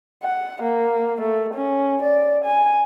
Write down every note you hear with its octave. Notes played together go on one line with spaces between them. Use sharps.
F#5
A#3
A3
C#4
D5
G#5